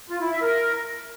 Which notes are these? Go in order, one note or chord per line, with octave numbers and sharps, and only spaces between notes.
F4
E4
E5
A#4